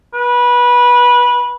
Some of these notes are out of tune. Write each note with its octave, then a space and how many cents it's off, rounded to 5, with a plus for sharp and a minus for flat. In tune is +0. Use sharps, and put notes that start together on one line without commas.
B4 -20